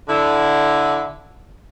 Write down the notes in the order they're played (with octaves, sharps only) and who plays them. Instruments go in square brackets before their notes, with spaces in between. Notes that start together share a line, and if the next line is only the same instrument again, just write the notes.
[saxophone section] D3 E4